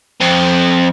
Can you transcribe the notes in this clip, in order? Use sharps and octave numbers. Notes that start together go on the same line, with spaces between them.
F2 C4